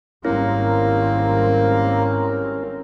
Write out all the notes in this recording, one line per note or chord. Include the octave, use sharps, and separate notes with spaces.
G#1 G3 A#3 C4 C#4 E4 A#4